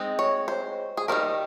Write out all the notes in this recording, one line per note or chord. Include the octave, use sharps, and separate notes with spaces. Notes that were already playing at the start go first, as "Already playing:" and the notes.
Already playing: G#3 C4 D#4
C#5
C5
G#4
D#3 G3 C4 A#4